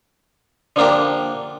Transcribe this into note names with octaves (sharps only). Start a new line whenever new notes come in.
D3 F3 A#3 D4 G4